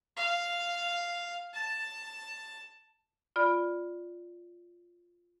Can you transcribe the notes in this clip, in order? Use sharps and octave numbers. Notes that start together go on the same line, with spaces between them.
F5
A5
F4 D5 B5 F6